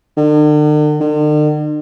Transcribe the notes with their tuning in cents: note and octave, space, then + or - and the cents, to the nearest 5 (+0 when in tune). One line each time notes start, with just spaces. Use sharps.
D3 +45
D3 +45